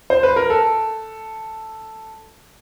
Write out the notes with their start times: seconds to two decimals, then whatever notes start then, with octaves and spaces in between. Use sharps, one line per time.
0.10 C5
0.23 B4
0.36 A#4
0.50 A4